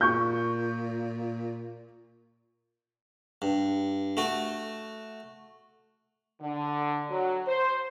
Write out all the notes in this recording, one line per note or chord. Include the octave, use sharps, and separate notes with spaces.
A#2 C#6 G6
G2
A3 F#4
D3
F#3
C5